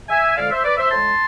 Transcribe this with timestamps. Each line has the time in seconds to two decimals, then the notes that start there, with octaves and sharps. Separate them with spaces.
0.09 E5 G#5
0.36 F2 D3 G#3 D5 F5
0.51 C5 E5
0.64 B4 D5
0.77 C5 E5
0.91 A2 G#3 A5 C6